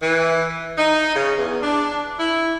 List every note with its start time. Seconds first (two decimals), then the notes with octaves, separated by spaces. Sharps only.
0.01 E3
0.77 D#4
1.15 C#3
1.37 E2
1.62 D4
2.19 E4